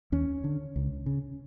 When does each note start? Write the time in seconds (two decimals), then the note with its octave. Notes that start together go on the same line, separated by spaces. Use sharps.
0.12 D#2 C#4
0.44 D3
0.76 C#2
1.06 C#3